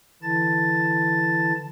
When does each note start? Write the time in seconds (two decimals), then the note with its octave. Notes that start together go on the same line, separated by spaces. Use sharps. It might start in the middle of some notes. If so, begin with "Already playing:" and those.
0.23 D3 E3 E4 A5 A6